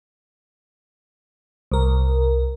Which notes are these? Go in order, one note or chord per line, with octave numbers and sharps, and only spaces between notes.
C2 A#4